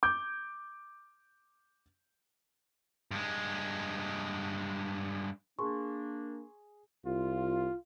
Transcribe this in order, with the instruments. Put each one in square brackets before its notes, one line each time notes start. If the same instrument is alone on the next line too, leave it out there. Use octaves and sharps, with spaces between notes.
[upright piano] D6 G6
[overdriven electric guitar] G2 G#3
[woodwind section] A#3 D4 [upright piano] G#4 [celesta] C6 C#6
[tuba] C2 [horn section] F4